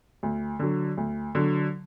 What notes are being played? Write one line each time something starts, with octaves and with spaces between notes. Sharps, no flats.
D2
D3 F#3
D2
D3 F#3